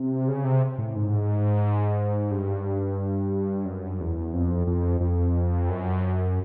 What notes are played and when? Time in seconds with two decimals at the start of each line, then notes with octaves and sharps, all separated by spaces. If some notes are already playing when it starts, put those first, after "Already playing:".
Already playing: C3
0.28 C#3
0.44 C3
0.78 A2
0.96 G#2
2.31 G2
3.65 F#2
4.00 E2
4.34 F2
4.67 F2
5.01 F2
5.69 F#2